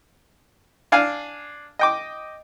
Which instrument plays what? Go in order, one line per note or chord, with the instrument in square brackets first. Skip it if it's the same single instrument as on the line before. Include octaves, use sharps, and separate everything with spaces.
[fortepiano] D4 F5 G#5
D#5 G5 D6